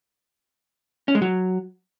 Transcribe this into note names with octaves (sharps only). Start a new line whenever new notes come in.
C#4
G#3
F#3